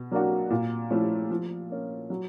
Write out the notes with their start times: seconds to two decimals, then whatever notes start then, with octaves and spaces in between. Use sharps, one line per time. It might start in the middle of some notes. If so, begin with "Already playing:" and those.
Already playing: B2
0.11 F#3 A#3 D4 F#4
0.50 A#2
0.90 F3 A3 C#4 E4
1.30 F3
1.70 A#3 C#4
2.10 F#3